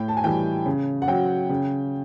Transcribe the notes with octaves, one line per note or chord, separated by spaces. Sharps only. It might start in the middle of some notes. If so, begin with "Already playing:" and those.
Already playing: A2 G5
A5
G#5
E3 G3 G5
C#3
F#5
F#3 G5
C#3